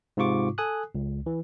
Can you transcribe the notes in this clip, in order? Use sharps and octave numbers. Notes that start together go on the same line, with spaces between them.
G#2 C3 F4 C#6 D6
A4 G#5 D#6 F#6
C#2
E3